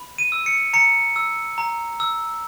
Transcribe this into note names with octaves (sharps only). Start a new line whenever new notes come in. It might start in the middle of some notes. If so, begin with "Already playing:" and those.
Already playing: B5
D#7
E6
C#7
A#5 C#7
E6
A#5
E6